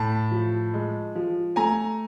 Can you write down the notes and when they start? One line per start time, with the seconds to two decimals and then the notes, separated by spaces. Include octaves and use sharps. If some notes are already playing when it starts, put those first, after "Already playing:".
Already playing: A2 A5 B5
0.31 F3
0.74 G#3
1.15 F3
1.56 A3 G#5 A#5